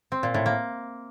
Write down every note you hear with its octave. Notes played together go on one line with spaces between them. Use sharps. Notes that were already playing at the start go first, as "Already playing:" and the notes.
C4
A#2
A2
A#3